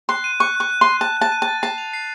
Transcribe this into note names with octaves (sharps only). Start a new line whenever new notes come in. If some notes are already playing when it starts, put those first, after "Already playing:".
C6 F#6
D#7
C#6 F#6
C#6 F#6
F#6
C6 F#6
A5 F#6
A5 F#6
D#7
A5
A6
A5 C7
F7
C7